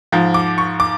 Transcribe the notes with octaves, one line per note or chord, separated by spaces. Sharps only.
G#2 F3
D6
C#6
D6